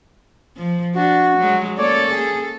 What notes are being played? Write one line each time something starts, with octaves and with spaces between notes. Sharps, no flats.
F3
D4 F#4
F#3 G#3
A#3 C#4 A4 C#5 D5
G#4